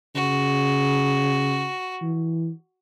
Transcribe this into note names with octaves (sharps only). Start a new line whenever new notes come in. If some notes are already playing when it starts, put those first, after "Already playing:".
C#3 F#4
E3